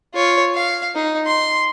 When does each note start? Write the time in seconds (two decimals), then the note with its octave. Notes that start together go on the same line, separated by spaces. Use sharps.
0.14 F4 C#5
0.55 F5
0.95 D#4
1.26 C6